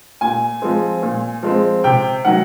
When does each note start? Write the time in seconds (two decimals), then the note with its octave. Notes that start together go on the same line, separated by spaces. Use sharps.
0.21 A#2 G#5
0.62 F3 G#3 C4
1.02 A#2
1.43 F3 G#3 C4
1.84 C3 G5
2.25 D#3 F#3 F#5